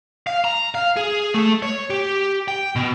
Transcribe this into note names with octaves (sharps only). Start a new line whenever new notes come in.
F5
A#5
F5
G#4
A3
C#5
G4
G5
B2